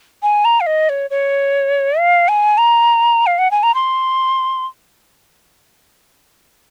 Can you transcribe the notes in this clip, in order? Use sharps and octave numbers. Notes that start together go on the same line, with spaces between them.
G#5
A#5
F5
D#5
C#5
C#5
F5
G#5
A#5
F5
F#5
G#5
A#5
C6